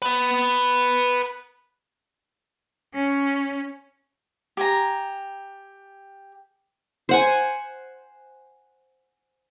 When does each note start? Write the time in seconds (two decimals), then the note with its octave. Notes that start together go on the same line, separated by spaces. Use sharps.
0.02 B4 F#5
2.95 C#4
4.57 G4 G#5 A#5
7.09 C5 F#5 G#5